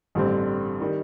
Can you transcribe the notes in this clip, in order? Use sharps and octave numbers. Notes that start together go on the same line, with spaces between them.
A1 G2 D3 G3 C4
D#3 G3